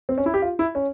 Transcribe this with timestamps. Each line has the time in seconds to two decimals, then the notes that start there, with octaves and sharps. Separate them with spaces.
0.09 C4
0.18 C#4
0.26 E4
0.34 G4
0.42 F4
0.59 E4
0.75 C#4